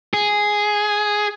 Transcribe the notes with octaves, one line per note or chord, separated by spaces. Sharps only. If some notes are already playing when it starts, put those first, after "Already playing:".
G#4